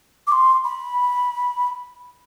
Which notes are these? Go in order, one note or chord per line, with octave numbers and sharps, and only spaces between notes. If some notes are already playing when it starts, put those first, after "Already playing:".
D6
C6
B5